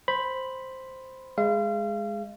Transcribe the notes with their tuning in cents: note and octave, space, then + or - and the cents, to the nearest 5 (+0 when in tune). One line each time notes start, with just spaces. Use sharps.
C5 +0 B5 +0
G#3 +0 F5 -35